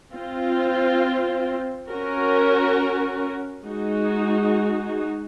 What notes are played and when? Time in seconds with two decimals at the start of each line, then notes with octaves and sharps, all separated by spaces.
0.13 C4 F4 C5
1.88 C#4 F#4 A#4
3.63 G#3 D#4 F#4